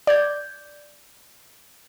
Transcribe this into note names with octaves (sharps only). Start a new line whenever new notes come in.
D5 G6 G#6